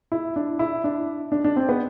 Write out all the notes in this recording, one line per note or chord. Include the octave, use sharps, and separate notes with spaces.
E4
D4
E4
D4
D4
D4
C4
B3